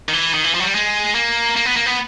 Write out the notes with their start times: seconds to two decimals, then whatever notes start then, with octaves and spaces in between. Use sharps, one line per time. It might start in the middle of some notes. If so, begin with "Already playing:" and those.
0.09 D#3
0.13 E3
0.34 D#3
0.44 E3
0.54 F3
0.60 F#3
0.64 G3
0.75 G#3
1.15 A#3
1.56 A#3
1.65 B3
1.76 A#3
1.86 B3